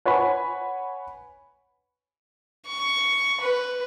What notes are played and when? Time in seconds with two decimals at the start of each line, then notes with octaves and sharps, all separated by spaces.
0.05 B4 C#5 F#5 G#5 B5
2.66 C#6
3.41 B4